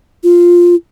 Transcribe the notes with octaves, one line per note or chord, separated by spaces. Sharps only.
F4